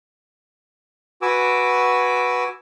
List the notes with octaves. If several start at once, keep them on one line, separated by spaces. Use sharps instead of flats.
F#4 B4 G#5 D6 E6